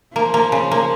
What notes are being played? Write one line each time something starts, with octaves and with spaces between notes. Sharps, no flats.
F3 A#3
A#3
C#3
A#3